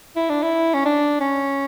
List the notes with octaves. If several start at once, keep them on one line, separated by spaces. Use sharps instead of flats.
E4
D4
E4
C#4
D4
C#4